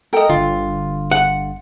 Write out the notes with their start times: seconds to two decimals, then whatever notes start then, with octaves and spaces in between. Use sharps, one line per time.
0.13 A4 A#4 D#5 G5
0.29 G1 D3 F4
1.11 F#5